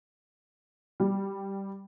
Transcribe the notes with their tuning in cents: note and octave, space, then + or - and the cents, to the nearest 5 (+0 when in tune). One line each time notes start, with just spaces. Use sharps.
G3 +0